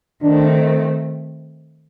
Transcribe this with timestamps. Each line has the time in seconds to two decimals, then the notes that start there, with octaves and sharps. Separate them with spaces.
0.23 D#3 A3 C4 D4